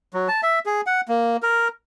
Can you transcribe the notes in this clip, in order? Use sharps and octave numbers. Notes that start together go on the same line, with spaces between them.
F#3
A5
E5
G#4
F#5
A#3
A#4